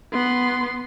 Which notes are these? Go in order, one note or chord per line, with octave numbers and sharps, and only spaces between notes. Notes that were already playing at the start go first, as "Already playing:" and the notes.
B3 C6